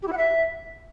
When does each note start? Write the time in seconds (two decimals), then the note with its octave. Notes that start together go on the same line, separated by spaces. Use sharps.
0.02 G4
0.07 E4
0.12 F#5
0.17 E5